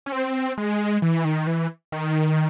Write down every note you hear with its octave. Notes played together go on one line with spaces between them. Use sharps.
C#4
C4
G#3
E3
D#3
E3
D#3